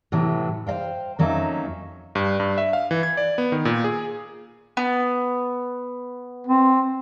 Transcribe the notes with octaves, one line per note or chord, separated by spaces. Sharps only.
A2 C3 E3 F#3
C5 D#5 F5 G5
F2 F#3 A#3 C#4 D#4 E5
G2
G2
E5
F5
E3
G#6
D5
B3
D#3
A#2
G#4
B3
C4